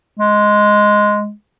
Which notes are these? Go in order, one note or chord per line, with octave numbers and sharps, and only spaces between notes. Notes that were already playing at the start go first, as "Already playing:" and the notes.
G#3